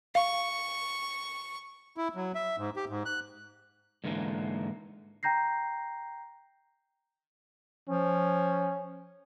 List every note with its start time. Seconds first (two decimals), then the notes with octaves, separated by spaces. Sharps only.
0.15 F5 C#6
1.97 E4
2.15 F#3
2.35 E5
2.58 G#2
2.76 G4
2.89 G#2
3.06 F#6
4.04 G#2 D3 E3 A3 A#3
5.23 G5 A#5 G6 A#6 C7
7.89 F3 C#4